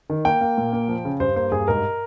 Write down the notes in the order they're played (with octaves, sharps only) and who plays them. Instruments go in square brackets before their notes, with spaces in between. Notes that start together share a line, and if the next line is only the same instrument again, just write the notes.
[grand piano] D#3
A#3 G5
A#3
A#2
A#3
F3
C#3
G2 C5
A#3 C5
G2 G#4
G#2 A#4